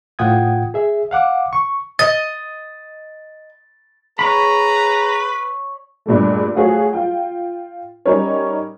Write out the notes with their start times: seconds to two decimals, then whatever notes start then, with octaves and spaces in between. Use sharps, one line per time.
0.19 A2 F4 F#5 G5 D#6 G#6
0.74 G#4 E5
1.11 F5 F#5 D6
1.53 C#6
1.99 D#5 A6
4.19 G#4 B4 C#5 A#5 B5
6.06 G2 A#2 G#3 A3
6.54 A3 F4 F#4 G#4 C#5
6.93 F4 G5
8.05 G3 C#4 D#4 A#4 C#5